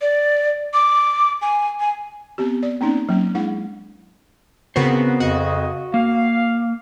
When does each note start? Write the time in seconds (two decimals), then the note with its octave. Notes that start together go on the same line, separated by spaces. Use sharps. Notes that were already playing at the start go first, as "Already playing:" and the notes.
0.01 D5
0.74 D6
1.42 G#5
1.80 G#5
2.38 B3 C4 G4
2.63 D5
2.81 A#3 C4 C#4 D#4
3.09 F#3 A#3 C#4
3.35 G#3 D4 E4 G#4 F#5
4.76 C#3 B3 C4 F#4 A#4 C5
5.20 F2 C#3 F#4 D#5
5.94 A#3 F5